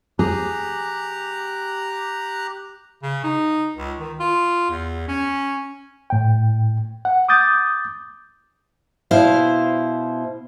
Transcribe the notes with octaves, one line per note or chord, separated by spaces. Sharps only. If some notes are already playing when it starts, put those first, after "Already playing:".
G4 G#4 A#5 F#6
C#3
D#4
C#2
D#3
F4
E2
C#4
A2 G5
F#5
D6 D#6 G6 A6
B2 E4 C5 F5